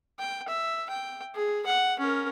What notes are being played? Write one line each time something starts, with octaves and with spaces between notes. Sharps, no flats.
G5
E5
G5
G#4
F#5
C#4 A#4